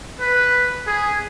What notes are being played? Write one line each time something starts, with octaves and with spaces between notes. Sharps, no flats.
B4
G#4